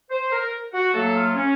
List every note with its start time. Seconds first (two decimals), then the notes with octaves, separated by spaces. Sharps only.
0.11 C5
0.32 A#4
0.74 F#4
0.94 A2 F#3 A#3 A4
1.15 F4
1.35 C#4